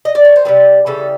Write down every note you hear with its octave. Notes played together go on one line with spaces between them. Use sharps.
D#5
D5
C#5
C5
C3 D#3 G3 B4
C#3 E3 G3 A4